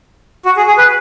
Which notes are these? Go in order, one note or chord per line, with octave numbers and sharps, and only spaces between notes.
F#4
G#4
G#4
B4